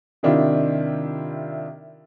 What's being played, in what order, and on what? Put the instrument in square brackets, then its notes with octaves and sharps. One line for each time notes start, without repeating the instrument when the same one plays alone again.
[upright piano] C3 D#3 D4 E4 F4 G4